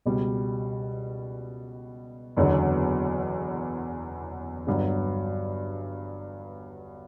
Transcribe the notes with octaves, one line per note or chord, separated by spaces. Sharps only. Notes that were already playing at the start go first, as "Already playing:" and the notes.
C#2 B2 G3
F#1 E2 D3 F#3
G1 G2 F#3